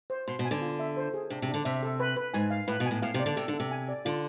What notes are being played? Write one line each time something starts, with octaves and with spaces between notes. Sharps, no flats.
C5
B2 C6
B2
G#5
D3
F4
E5
C5
G#4
C3 D4
C3
D4
D3
C3 E5
A4
B4
B4
G#2 G#5
F5
A2 B4
B2
A2 G#5
A2 F5
C3
D5
D3
C3 A4
D3
A4
C3
G#5
D5
D3 F4